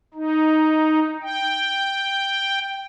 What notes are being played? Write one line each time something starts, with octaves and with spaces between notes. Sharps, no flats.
D#4
G5